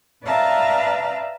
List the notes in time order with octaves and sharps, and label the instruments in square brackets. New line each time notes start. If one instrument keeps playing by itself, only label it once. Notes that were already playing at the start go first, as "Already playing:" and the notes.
[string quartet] B4 D5 E5 F5 A5 A#5